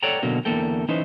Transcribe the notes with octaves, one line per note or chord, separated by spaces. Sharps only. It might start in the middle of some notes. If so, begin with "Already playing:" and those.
A4 C#5 D5 F#5 G5 A#5
B2 D3 F#3 A#3
E2 D3 A#3 A4 G5
E3 C#4 D#4 B4 C5